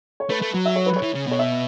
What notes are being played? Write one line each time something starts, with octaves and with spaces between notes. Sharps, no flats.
C#5
A3 B4
A3
F#3
E5
C#5
B4
C#5
E3
C#3
B2 C#5
E5